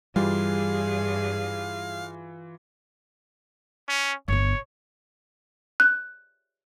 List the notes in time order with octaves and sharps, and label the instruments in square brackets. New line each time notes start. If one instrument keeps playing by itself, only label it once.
[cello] G2 G#4 [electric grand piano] E3 F4 [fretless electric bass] G3 [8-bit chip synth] F5
[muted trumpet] C#4
[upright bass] G1 B3 [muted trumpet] C#5
[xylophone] F#6